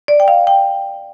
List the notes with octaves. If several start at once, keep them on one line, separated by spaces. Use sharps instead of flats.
D5
G5
F5
G5